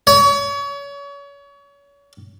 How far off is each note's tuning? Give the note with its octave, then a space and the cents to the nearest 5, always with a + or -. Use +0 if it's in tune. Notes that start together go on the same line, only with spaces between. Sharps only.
C#5 +35